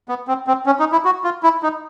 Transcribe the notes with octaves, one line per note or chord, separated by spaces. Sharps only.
B3
C4
C4
C#4
D#4
E4
F#4
F4
E4
D#4